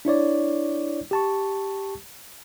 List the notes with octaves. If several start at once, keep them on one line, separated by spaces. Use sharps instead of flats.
D4 E4 C#5 D5
G4 A5 C#6